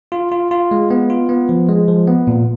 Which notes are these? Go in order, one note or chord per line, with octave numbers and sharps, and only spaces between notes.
F4
F4
F4
G#3
B3
F4
B3
F3
G#3
F3
B3
A#2